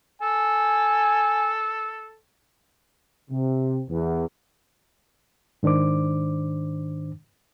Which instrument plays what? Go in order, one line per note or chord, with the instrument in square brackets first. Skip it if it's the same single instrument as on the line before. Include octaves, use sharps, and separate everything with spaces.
[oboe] A4 [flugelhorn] G#5
[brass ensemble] C3
E2
[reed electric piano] G#2 D#3 D4 C5 D6